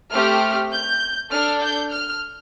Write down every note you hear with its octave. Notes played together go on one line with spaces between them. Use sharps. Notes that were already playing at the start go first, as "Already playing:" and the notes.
A3 C4 G4 F6
G6
D4 A4 F6
G6
F6